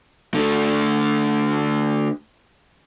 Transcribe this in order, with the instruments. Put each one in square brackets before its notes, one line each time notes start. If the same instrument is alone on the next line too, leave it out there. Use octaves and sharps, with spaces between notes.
[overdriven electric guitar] D3 A3